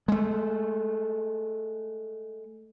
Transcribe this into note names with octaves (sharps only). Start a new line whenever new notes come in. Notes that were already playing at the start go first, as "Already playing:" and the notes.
G#3 A3